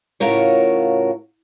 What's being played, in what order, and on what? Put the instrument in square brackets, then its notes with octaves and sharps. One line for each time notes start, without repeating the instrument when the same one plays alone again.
[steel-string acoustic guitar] A2 C#3 F4 F#4 A#4 C#5